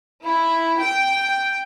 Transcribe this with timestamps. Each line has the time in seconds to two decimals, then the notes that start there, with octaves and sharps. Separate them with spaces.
0.23 E4
0.82 G5